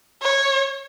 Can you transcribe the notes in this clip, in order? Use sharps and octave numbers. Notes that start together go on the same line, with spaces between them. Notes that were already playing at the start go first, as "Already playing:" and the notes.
C#5